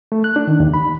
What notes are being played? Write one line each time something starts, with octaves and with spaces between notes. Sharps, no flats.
A3
F#6
D4
D#3
D#2
B5